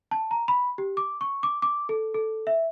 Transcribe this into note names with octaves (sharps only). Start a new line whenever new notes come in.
A5
A#5
B5
G4
D6
C#6
D6
D6
A4
A4
E5